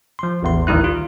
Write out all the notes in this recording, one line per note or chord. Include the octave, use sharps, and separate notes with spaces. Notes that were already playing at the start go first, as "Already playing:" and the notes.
F3 C6
A1 E2 C6
A1 D2 D#3 G3 E4 F#6
F4